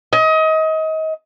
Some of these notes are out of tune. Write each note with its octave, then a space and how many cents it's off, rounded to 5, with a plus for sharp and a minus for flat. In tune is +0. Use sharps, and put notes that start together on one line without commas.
D#5 +30